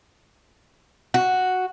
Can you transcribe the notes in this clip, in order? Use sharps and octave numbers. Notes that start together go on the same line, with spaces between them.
F#4